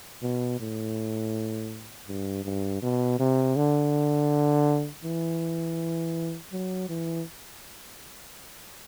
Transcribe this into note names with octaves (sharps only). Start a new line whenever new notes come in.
B2
A2
G2
G2
B2
C3
D3
E3
F#3
E3